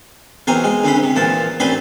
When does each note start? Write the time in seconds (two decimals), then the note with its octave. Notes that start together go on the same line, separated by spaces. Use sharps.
0.47 B1 E2 C4 A#4 G#5
0.64 G#3
0.84 D2 C4 C#4 B5
1.03 C3
1.16 E2 A#2 F3 A5
1.60 A1 A3 C4 D4 G#5 B5